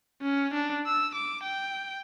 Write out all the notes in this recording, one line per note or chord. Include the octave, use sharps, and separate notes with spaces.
C#4
D4
E6
D6
G5